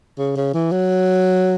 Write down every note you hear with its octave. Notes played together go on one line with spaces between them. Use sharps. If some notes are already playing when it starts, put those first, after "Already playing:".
C#3
C#3
E3
F#3